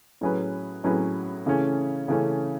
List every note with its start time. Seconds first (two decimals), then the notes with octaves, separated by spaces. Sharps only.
0.21 A2 F#3 C#4 G#4 B4
0.84 A2 F#3 C#4 G#4 B4
1.46 C#3 E3 A3 C#4
2.08 C#3 E3 A3 C#4